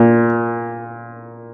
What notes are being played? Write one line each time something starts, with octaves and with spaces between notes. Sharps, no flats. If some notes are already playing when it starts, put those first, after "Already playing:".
Already playing: A#2